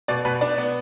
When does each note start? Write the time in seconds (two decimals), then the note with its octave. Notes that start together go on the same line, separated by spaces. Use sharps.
0.08 B2 D5
0.25 B2 B4
0.41 D4 D5
0.58 B3